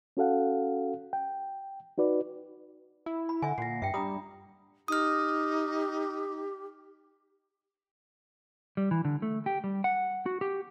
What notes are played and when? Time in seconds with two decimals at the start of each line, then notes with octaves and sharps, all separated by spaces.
0.17 C#4 F#4 A4 F5 F#5
1.13 G5
1.98 D#4 F#4 B4 D5
3.06 E4
3.29 B5
3.42 D3 E5 F#5 G#5
3.58 A#2 A#6 C7
3.82 G2 E5 G5
3.94 G3 D4 A#5 B5 D#6
4.88 D#4 G4 D#6 F6
8.77 G3
8.91 E3
9.05 D3
9.22 A3
9.46 G4
9.64 G3
9.84 F#5
10.26 F#4
10.41 G4